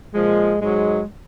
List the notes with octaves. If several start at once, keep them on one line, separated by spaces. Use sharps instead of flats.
A#2 F3 G#3
G#2 F#3 G#3